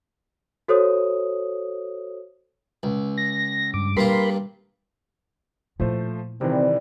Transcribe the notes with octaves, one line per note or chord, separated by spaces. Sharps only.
F#4 A4 C5 C#5 D#6
C#2
A#6
G2 D6
G2 A#3 F4 A#4 B5 C6
A#2 F3 A3 E4 C5
C3 D#3 E3 G3 C4